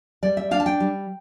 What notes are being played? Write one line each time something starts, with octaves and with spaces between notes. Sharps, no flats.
G3 D5
E5
D4 F5
A5
G5
G3